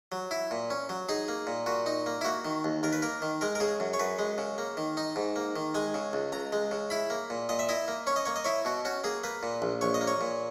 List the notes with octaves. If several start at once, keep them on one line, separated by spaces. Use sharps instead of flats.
F#3
E4
A#2
C#4
F#3
D#4 G#4
A#3
A#2
A#2 F#4
D#4
A#3
E4
A#3 F#4
D#3
D#2
D#2 A#4
B4
A#3 A#4
D#3
G#3 A#4
A#4
C#3 G#4
F#2
C#5
F#2 B4
G#3
C#3
A#3
D#3
D#4
G#2
A#3
D#3
G#3 G#5
C#3
C#2
C#2 A#5
G#3
C#3
E4 B5
A#3
A#2
A#2 D#5
E5
E4 D#5
A#3
C#4 C#5
D#5
A#3 C#5
D#5
E4 C#5
B2 F#4
C#4 F#4
A#3 G#4
A#3 B4
A#2
A#1
A#1 C#5
D#5
A#3
C#5
A#2